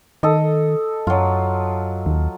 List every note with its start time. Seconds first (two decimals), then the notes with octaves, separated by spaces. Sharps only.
0.23 D#3 A4 D#5
1.07 F#2 F#3 F4
2.06 D#2